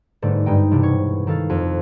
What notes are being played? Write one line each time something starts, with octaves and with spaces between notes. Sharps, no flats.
G1 G#2 A3 A4 D5
G2 G#3 D#4 G5
E1 C3 D4
C#5
D#3 A4 F5 A6
F2